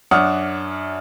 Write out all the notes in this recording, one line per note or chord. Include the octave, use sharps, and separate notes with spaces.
F#2 D4 C#5 F#5 D#6 F6